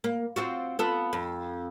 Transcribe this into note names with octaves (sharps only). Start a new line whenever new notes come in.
A#3
C4 F4 F#4
B3 F4 A4
F2